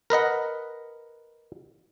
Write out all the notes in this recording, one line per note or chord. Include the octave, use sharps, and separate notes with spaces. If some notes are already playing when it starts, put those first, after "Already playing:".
A#4 B4 D#5 F#5